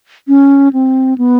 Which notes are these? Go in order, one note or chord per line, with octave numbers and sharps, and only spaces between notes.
C#4
C4
B3